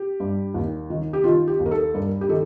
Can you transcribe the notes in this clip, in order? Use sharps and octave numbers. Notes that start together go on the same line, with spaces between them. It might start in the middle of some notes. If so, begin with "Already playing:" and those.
Already playing: G4
G2
D#2
D#3
G4
D#3 F4
G4
D#2
A#4
A4
G2 A#4
G4
D#3 A4